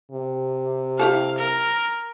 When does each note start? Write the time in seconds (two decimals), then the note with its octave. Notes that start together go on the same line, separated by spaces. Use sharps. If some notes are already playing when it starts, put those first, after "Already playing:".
0.12 C3
0.99 E4 G4 A4 F5
1.39 A#4